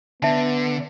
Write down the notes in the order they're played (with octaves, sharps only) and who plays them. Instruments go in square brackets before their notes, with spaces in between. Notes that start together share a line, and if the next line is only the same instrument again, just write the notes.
[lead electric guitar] D3 [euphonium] B3 [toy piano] E5 A5